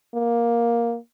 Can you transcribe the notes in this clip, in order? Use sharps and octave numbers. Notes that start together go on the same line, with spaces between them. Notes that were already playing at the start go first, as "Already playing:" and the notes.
A#3